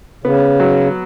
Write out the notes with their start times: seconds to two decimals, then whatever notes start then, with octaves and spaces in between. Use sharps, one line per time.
0.24 C#3 B3
0.60 F#3